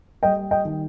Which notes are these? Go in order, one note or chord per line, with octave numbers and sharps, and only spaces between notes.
G3 D#5 G5
D#5 G5
D#3